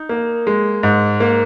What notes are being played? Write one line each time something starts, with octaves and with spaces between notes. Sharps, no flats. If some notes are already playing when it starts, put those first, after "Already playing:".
Already playing: D#4
A#3
G#3
G#2
A#3